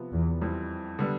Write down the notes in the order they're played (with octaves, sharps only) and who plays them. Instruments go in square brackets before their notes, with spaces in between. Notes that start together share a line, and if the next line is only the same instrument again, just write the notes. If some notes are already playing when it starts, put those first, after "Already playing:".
Already playing: [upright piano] C3 F3 B3
[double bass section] E2
[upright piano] F2 E3 G3 C4
D3 G3 B3 D4